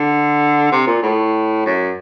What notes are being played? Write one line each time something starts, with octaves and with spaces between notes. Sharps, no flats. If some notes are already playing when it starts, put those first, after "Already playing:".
Already playing: D3
C3
A#2
A2
F#2